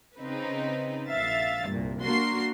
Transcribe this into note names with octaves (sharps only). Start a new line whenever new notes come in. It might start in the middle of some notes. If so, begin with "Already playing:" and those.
C#3 C4 D#4 B4
A#1 E5 F5 A6
C2 G2 A#2
A#3 D4 F#4 A#4 C6 C7